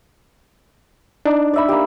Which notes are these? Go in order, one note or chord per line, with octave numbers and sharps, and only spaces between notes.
D4 D#4
D5 E5 B5
A#3 G4